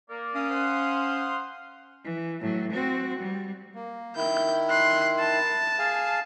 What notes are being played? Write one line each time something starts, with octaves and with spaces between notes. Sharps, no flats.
A#3 A#4 D5
C#4 F5 D#6
C5 F#5 C6
E3
A2 F#3
C4 F#4
G3
A#3
D#3 E4 G6
C6 F#6
A5
G#4 F5 G#5